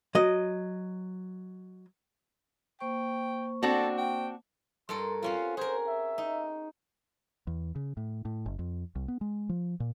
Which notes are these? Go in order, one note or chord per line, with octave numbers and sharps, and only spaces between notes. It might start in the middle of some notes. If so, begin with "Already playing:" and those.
F#3 D#5
A#3 C5 G5 C#6
C4 D4 F#4 A4
G5
G2 A4 A#4 C6
C4 C#4 F4 F#4
G#4 A#4 C5
E5
D#4
E2
C#3
A2
A2
F#1
F2
C2
B3
G#3
F3
A#2